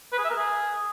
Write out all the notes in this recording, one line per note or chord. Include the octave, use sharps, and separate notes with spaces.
B4
G#4
E5
A#4
G#4